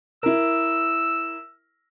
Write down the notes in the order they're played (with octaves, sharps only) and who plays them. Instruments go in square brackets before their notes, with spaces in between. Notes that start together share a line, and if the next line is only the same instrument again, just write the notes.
[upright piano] E4 A#4 [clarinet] E6